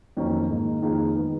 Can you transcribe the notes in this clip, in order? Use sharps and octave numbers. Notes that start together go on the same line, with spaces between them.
F2 D#3 F#3 A#3 C#4
G#2 D#3 A#3
F2 D#3 A#3 F4 G#4
D#3 G#3 B3 D#4